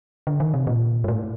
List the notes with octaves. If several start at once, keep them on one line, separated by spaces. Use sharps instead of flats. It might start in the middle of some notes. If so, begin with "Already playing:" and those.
D3
D#3
C3
A#2
G#2
A2